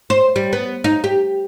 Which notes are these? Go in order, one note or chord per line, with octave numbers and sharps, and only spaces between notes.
C5
G3
B3
D#4
G4